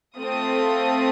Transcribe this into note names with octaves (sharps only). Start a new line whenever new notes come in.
A3 C4 F4 A4 D#6